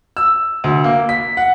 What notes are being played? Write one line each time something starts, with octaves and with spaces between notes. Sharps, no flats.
E6
D2
A#3
B6
F#5